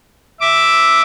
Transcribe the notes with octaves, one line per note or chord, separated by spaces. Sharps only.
E5 D6